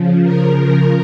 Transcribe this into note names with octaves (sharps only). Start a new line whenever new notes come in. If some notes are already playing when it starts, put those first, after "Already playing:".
Already playing: C#3 F3
A#4
A#4